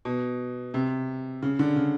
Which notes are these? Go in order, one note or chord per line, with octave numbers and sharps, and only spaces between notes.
B2
C3
C#3
D3
C#3